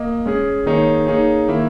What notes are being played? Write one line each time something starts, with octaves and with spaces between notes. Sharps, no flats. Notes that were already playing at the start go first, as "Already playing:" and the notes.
Already playing: A#3 D#5
G#3 C#4 G#4
D#3 A#3 D#4 G#4 C#5
A#3 D#4 G#4 C#5
D#3 A#3 E4